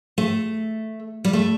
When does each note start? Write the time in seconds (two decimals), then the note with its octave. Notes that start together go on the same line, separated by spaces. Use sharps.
0.18 A3
1.24 G3
1.33 A3